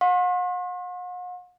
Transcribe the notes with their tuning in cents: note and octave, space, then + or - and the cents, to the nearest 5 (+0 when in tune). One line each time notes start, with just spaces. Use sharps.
F#5 -45 C6 +45